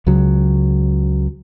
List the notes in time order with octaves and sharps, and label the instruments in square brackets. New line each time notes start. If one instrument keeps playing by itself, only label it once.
[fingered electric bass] C#2 C#3 F#3